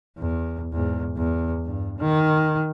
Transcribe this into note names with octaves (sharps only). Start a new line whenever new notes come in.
E2
E2 G#2
E2
G2
D#3